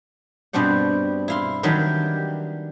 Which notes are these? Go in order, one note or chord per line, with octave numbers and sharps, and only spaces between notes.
G2 B2 G3 C4 D4 F#5
E4 F5 C6
D#3 E3 F#3 G3 D4 G4